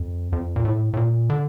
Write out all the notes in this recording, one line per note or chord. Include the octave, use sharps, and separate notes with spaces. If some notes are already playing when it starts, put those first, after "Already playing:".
Already playing: F2
F2
A#2
A2
A2
A#2
D3